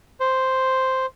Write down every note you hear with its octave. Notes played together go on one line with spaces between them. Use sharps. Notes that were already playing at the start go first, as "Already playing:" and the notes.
C5